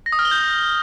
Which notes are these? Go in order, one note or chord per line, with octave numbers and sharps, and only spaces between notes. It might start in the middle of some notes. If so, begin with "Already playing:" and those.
A#6
D#6
F6
G7
G6